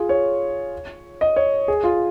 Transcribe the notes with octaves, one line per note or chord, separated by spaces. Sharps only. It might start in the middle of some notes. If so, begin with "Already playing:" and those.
Already playing: F4 G#4
C#5
D#5
C#5
G#4
F4